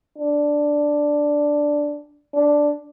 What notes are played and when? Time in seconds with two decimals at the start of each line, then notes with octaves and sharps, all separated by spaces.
0.18 D4
2.34 D4